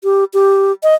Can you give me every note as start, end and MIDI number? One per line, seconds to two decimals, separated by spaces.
0.04 0.24 67
0.34 0.72 67
0.83 0.95 75